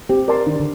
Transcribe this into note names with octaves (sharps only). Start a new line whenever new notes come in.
C4 G4
A#4 D5 A5 C6
D#3 D4
D3